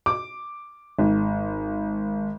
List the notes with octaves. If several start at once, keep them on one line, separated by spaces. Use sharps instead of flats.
D6
G#1